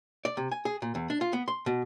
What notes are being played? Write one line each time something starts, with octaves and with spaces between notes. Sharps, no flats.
D5
C3
G#5
G#4
A#2
E2
D4
F4
B3
C6
B2